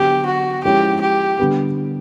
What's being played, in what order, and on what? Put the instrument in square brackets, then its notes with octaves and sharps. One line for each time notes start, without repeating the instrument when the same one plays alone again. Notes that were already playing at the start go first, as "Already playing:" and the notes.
Already playing: [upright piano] D3 F#3 B3 [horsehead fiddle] G4
[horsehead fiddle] F#4
[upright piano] F3 G#3 C#4 E4 [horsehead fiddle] G4
[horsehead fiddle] G4
[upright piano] D3 G3 B3